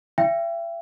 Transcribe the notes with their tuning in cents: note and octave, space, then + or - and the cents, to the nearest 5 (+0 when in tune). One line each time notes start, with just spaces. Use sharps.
E5 +40 G5 +0